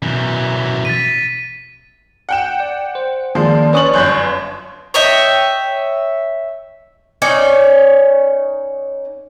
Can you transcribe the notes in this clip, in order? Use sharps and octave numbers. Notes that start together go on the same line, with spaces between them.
F#2 B2 E3
A6 B6 D#7
F#5 G5 E7
D5
C5
D#3 F3 G#3 A#3 D4 D5
C#4 B4 C#5 C#6 D#6 F#7
G1 F#2 C#5 C6 F#6 G6
C#5 D#5 E5 G5
C#4 D#4 C#5 D5